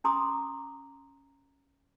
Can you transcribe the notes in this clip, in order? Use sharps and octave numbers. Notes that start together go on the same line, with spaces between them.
C#4 G#5 A#5 C6 D6 D#6